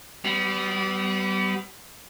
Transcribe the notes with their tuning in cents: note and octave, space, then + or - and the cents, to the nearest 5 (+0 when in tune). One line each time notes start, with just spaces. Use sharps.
G3 -30 B3 +20